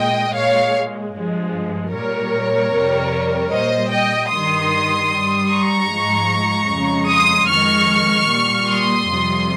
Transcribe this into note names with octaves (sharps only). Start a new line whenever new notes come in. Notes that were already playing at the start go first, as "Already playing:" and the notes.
Already playing: A#2 G#3 D#5 G5
A#2 G#3 C#5 F5
G2 F3 G#3
A#2 G3 A#4 C#5
F2 C3 G3
A#2 G3 C5 D#5
D#5 G5
G2 D#3 G3 C6 D#6
G2 G3
A#5 C#6
G#2 F3 G#3
F2 C#3 G#3
C6 D#6
F2 D#3 G#3 C#6 F6
A#2 G3
C6 D#6
F2 C3 G3